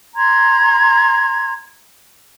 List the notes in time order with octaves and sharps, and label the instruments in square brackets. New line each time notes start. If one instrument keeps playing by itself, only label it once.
[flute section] A#5 C6 G#6